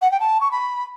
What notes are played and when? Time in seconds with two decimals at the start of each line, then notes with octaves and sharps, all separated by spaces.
0.02 F#5
0.11 G5
0.20 A5
0.41 C#6
0.51 B5